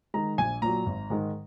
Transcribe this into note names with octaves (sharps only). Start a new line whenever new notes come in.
D#3 G#3 A#5
A#1 G#5
A#2 F#3 A#5
G#1
G#2 D#3 G#3